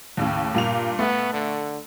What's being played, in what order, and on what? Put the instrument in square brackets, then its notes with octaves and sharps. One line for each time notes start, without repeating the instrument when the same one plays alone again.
[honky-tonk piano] D#2 A2 C#3
[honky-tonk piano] G2 A#2 F7 [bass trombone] A#3
[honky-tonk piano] A3 [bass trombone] B3
[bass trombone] D3